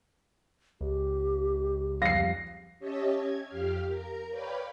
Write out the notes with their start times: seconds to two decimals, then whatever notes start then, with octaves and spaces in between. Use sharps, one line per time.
0.81 C#2 G4
2.02 F2 G3 F5 A#6 C7
2.79 C#4 G4 C#5 D#5 E5 A5
3.14 G#6
3.48 F2 G4 F5 F6
3.87 A#4 A#5
4.30 B4 C#5 D5 F5 G5 B5